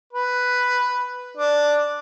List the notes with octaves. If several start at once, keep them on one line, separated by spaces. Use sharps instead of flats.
B4
D4